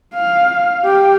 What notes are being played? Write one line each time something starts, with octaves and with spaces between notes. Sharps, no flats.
F5
G4